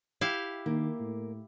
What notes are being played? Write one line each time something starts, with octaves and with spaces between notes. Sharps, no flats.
E4 G4 F5
D#3 A#3
A2